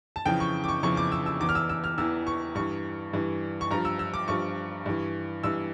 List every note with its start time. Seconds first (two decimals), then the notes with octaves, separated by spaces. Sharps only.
0.16 A5
0.26 F2 C#3 E3 G5
0.40 C#6
0.64 D6
0.68 C#6
0.83 F2 C#3 E3 C#6
0.97 D6
1.12 E6
1.26 E6
1.40 E2 E3 D6
1.49 F6
1.55 E6
1.69 E6
1.84 F6
1.98 E2 E3 E6
2.27 C#6
2.55 G2 E3 C#6
3.13 G2 E3
3.61 C#6
3.71 G2 F3 A#5
3.85 E6
3.99 E6
4.14 D6
4.28 G2 F3 C#6
4.86 G2 E3
5.43 G2 E3 E6